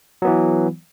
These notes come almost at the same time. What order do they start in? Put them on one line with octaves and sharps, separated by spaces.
F#3 B3 E3